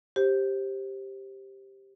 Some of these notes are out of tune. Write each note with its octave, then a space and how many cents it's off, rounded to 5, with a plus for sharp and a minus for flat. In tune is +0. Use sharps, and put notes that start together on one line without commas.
G4 +0 C5 +20